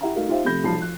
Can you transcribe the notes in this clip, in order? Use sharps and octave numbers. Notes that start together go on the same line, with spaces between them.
E4 G4 E5 F#5 A#5
A3 D#4 F#4 A#4 F5
D#4 F4 G4 C5 E5 F5
C3 F3 A3 B5 G6 A#6
B1 F3 G3 A5 B5 C7
F3 F#6